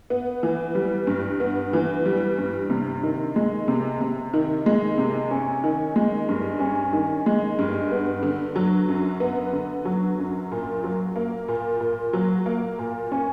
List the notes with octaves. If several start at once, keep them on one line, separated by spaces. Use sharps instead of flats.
B3
E3
G3
G2
B3
E3
G3
G2
C3
D#3
G#3
C3
C3
D#3
G#3
C3
C#4
D#3
G#3
G2
C#4
D#3
G#3
G2
B3
D3
F#3
F#2
B3
D3
F#3
F#2
A#2
F#3
A#3
A#2
A#2
F#3
A#3
A#2
C#4